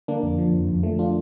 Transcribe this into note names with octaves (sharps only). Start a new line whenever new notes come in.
D3 A#3 D4
F2
F3
F2
F2
F3 A3
D4 F4